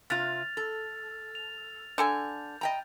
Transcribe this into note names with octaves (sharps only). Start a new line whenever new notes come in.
C3 F4 F6 A6 F7
A4
F7
D3 A4 G#5 G6
D#5 G5 A#5